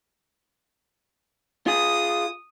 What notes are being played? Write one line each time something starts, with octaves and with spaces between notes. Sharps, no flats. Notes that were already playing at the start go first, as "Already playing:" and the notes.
F4 G#4 D#6